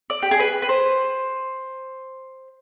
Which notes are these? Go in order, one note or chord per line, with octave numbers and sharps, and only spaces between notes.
D5
G4
G#4
B4
B4
C5